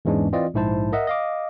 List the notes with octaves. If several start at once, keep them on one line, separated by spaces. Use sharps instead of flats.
E2 G#2 E3 G#3 C#4 D4
E3 C4 F4 D5 D#5
A#1 G#2 E4 C5 A5
A#4 D#5 E5 F#5
D#5 F5 D6